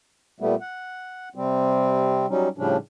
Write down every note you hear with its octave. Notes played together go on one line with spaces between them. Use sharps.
A#2 G3 A3 B3
F#5
C3 G3 C4
F#3 G3 C#4 D#4
A2 C#3 F3 G3 C#4 D4